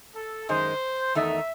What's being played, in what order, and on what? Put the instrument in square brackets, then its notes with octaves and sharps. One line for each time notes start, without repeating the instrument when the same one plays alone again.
[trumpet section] A4
[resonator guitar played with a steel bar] F#2 D#3 G#3 [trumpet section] C5
[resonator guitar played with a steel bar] E2 D#3 A3 D#4 [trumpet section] E5